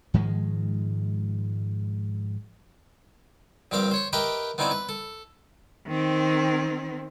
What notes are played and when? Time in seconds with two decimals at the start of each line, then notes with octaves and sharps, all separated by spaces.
0.14 G#2 D#3 F3 G#3
3.71 A#1 G2 C4 G4 F5 D6
3.91 C5 C#5 C#6
4.13 G4 A#4 B4 D#5 E5 G5
4.58 B3 C4 D#4 E4 D5 G#5
4.71 B4
4.89 A4
5.88 D#3 C4